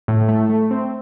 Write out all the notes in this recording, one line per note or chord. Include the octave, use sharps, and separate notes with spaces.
A2
A3
A3
C4